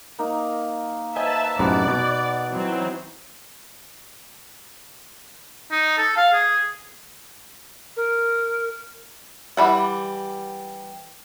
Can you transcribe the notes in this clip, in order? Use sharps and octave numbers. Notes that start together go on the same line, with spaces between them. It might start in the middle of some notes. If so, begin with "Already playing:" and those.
A#3 D#4
B4 C5 D#5 E5 G#5 A5
F#2 A2 C3 B3 D#4 D5 F#5
B2
E3 F#3 C4
D#4
A4
F5
G#4
A#4
E3 G3 F#5